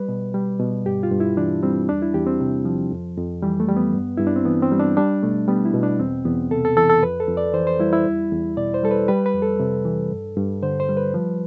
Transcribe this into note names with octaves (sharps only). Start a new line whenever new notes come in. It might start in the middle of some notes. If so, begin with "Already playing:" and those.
Already playing: G3 B4
B2
G3
B2
G2 G4
F4
G2
E4
E3 D4
G3 C4
E2 D4
E4
E2 G4
C4
C3
F3
F2
F2
E3 G3
A3
G3
B3
G2
G2 E4
D4
C4
E3 B3
C4
G3
D4
G3 D4
B2 A3
G3 B3
E4
B2
D4
E2 C4
E2 B3
C3 A4
A4
E3 A4
A4
F2 B4
A4
F2
D5
E3 C5
C5
G3 E4
E4
E2
E2
B2 D5
C5
G3 A4
B4
G3 B4
B4
F2
A4
C3
E3
G2
G2
D3 C5
C5
G3
B4
F3